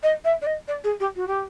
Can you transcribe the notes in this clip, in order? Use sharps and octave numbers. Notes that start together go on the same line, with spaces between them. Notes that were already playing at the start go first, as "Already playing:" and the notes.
D#5
E5
D5
D#5
D5
G#4
G4
F#4
G4